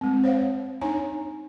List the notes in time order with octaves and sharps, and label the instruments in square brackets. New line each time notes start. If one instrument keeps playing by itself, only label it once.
[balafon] G#3 C4
C5 C#5 F5 F#5
D4 D#4 C#5 G#5 A#5